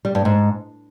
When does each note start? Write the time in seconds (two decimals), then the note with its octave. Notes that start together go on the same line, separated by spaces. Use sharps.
0.05 G3
0.15 G2
0.25 G#2